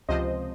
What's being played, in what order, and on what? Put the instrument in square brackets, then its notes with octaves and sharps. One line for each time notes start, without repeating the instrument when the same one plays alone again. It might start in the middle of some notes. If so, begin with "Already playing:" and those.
[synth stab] C#2 C3 F3 C5 D#5